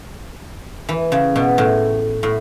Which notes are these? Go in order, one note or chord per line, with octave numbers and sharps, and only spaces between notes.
E3
C#3
B2
A2
A2